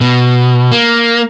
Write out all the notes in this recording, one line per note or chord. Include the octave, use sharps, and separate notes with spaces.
B2
A#3